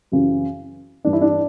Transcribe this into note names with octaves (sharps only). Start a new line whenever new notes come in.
F#2 C#3 E3
G2 E3 D4
E4
D4